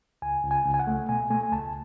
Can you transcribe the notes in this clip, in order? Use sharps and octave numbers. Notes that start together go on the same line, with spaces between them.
C#2 G#5
C#2
G#5
C#2
G#5
F#5
A3
B2 G#5
A3 G#5
G#5
C#2 A5